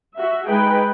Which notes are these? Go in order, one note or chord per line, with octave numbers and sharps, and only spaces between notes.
F#4 E5
G#3 D#4 G#4 B4 G5